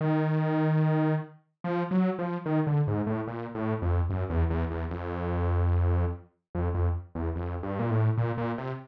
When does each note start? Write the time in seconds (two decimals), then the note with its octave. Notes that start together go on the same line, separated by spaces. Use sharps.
0.01 D#3
1.64 F3
1.91 F#3
2.19 F3
2.46 D#3
2.67 D3
2.87 G#2
3.07 A2
3.28 A#2
3.55 A2
3.82 F2
4.10 F#2
4.30 E2
4.50 E2
4.71 E2
4.91 F2
6.55 F2
6.75 F2
7.15 E2
7.36 F2
7.63 G2
7.79 A#2
7.90 A2
8.18 A#2
8.38 A#2
8.58 C3